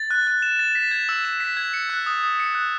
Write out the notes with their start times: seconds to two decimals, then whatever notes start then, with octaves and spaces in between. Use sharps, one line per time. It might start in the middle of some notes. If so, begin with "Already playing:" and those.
Already playing: A6
0.11 F#6
0.27 F#6
0.42 E7
0.59 A6
0.75 B6
0.91 G#6
1.09 E6
1.25 E7
1.40 B6
1.57 G#6
1.73 C#7
1.89 F#6
2.06 D#6
2.23 D#6
2.40 C#7
2.55 F#6